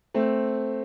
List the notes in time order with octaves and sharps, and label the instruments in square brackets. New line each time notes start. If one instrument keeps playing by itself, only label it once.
[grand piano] A3 C4